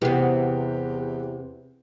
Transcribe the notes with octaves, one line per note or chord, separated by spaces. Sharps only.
E2 C3 E3 B3 G4